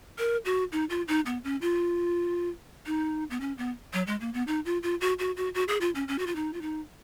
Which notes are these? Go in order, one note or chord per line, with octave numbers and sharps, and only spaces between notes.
A#4
F#4
D#4
F4
D#4
B3
C#4
F4
D#4
B3
C#4
B3
F#3
G#3
A#3
B3
D#4
F4
F4
F#4
F#4
F#4
F#4
G#4
F4
C#4
C#4
F#4
F4
D#4
F4
D#4